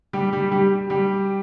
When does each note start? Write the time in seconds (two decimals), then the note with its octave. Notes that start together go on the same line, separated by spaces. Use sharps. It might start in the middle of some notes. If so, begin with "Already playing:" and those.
0.13 G3 G4
0.33 G3 G4
0.52 G3 G4
0.90 G3 G4